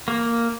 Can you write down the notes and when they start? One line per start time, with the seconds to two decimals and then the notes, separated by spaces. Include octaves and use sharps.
0.08 A#3